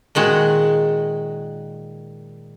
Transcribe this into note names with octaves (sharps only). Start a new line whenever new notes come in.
A#2 D#3 G#3 F#4